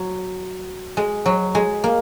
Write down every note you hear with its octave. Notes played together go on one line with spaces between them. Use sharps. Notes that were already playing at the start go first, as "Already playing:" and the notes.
Already playing: F#3
G#3
F#3
G#3
A#3